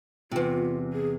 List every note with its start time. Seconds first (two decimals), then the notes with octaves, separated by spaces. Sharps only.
0.31 E2 C3 F4
0.92 G#4